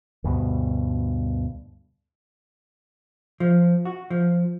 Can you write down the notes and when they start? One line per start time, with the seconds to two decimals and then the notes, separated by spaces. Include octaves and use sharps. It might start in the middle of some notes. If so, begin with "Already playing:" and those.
0.24 D2 G2 B2
3.40 F3
3.85 F#4
4.10 F3